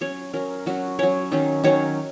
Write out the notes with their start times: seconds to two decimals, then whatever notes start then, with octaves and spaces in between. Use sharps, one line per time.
0.01 F#3 C#4 C#5
0.33 F#3 C#4 A#4
0.66 F#3 C#4 F#4
0.99 F#3 C#4 C#5
1.32 D#3 F#3 C#4
1.64 D#3 F#3 C#4 C#5